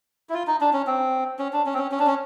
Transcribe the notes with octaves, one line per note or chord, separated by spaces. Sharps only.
E4
F4
D#4
D4
C#4
C4
C#4
D4
C#4
C4
C#4
C#4
D4
C#4